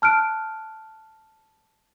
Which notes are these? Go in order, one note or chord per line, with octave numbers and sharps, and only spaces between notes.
A5 F6 F#6 D7